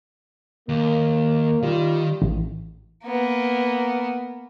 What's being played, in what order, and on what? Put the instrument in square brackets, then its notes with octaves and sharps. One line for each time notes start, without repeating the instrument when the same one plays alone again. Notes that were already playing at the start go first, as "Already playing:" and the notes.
[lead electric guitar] D#2 [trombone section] A#3
[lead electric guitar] D#3 [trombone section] G3 F4
[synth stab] A1
[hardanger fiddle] A#3 B3